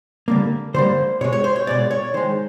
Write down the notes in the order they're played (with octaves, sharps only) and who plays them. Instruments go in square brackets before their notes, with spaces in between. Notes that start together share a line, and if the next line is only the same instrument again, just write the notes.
[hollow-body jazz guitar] D3 G3 A#3
D3 G3 A#3 C5
B2 C#5
G#3
C#5
C5
C#5
B2 G#3 D5
C#5
D#3 G#3 C5